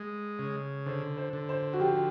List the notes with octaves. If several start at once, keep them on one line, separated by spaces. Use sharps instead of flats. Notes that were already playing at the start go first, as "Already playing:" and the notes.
Already playing: G#3
C#3
D3 C5
C5
D3
C5
F#4
F3 G4